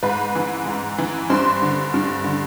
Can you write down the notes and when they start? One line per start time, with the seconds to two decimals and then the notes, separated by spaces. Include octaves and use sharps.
0.03 G#2 B4 B5
0.35 E3
0.66 G#2
0.98 E3
1.30 G2 C5 C6
1.62 D3
1.94 G2
2.24 D3